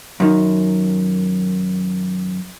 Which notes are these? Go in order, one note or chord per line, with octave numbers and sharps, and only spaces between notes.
F#2 D#3